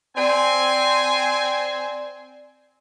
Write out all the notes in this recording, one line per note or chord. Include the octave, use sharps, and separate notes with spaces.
C4 D5 G#5